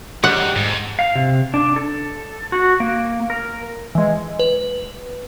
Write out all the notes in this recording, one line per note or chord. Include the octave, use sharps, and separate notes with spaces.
G#2 G3 F#5
F2 G#2
F5
C3
D4
A4
F#4
A#3
A#4
E3 G#3
B4